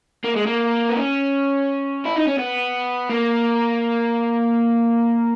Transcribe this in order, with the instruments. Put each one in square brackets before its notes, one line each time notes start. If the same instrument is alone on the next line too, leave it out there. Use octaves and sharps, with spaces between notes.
[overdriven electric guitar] A#3
G#3
A#3
B3
C#4
E4
D#4
C#4
B3
A#3